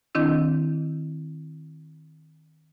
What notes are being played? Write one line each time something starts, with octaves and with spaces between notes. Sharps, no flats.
D#3 C4 D4 E4